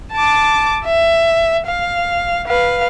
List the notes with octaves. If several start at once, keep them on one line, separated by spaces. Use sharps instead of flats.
A5 D6
E5
F5
B4 F5